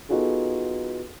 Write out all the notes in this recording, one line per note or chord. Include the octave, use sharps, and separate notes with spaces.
B3 D#4 F4 F#4 G#4 A4